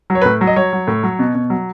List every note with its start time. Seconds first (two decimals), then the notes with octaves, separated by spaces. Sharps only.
0.10 F#3
0.15 C#5
0.22 A2 B4
0.41 F#3
0.47 D#5
0.56 F#3 C#5
0.73 F#3
0.87 A2
1.03 F#3
1.19 B2
1.35 B2
1.50 F#3